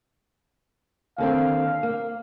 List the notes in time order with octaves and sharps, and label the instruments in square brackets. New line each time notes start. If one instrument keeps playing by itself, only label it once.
[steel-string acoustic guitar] D#2 D3 C4 [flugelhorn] F5
[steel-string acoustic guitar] A#3